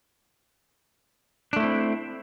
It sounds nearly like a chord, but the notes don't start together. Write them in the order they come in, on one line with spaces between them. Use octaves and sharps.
D4 A3 E4 C4